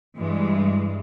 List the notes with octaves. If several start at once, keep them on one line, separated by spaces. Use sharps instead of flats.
G2 E3 G#3